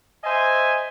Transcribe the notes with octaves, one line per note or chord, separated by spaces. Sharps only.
C5 D#5 E5 G#5